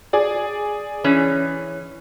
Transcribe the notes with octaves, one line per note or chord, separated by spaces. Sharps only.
G#4 D5
E3 C#4